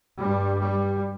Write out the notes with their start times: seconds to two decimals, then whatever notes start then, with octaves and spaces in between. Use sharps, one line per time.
0.19 G2 G3
0.60 G3